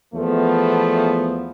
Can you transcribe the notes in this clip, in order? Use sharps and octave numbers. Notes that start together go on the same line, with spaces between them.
E2 F3 A3 B3